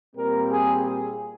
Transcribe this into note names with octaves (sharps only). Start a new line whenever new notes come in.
A#2 G3 C4 A#4
G#4
G#4